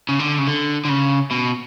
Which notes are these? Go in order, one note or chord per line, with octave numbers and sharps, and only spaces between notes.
C#3
D3
C#3
D3
D3
C#3
B2